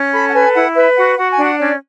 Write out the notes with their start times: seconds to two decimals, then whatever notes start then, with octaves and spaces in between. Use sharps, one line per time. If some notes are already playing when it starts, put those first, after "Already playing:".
Already playing: C#4
0.12 A4 B5
0.28 F#5
0.34 B4 G#5
0.54 E4 F#5
0.74 B4 E5
0.96 F#4 F#5
1.17 F#4 F#5
1.31 G#5
1.37 D4
1.44 F#5
1.58 C#4 D5